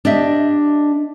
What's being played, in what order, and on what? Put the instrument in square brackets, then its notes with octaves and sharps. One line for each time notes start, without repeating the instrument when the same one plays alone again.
[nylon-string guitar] D4 G4 D#5 E5